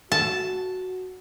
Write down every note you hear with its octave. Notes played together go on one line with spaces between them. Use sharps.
F#4 A5